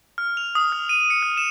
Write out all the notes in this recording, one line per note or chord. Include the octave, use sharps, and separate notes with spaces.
F6
F7
D#6
F6
D#7
C#7
F6
E7